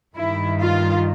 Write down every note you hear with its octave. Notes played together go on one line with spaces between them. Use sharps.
G2 D#3 E4
F4